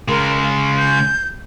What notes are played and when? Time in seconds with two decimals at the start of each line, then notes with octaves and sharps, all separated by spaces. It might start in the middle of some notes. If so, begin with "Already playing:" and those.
0.08 C#3 G#3 A#4
0.43 F5
0.76 G6